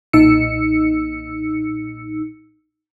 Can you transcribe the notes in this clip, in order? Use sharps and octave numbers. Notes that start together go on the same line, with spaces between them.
B1 A#2 D#4 E6 C#7